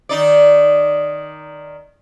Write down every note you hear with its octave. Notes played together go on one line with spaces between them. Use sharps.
D#3 D#4 D5